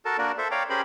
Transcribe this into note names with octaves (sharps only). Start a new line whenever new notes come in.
F#4 A4 A#4 A5
A#3 D4 F#4 A#4 D5
A4 C5 E5
C#5 D5 F5 G5 A#5
C#4 G4 G#4 A#4 C5 B5